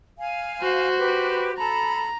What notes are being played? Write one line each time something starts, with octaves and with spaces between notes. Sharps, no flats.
F5 G#5
F#4 C5
G4 B4
A4 A#5 B5